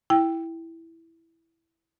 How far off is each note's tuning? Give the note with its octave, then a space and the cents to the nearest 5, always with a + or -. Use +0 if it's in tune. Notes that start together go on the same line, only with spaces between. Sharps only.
E4 +0 G5 +0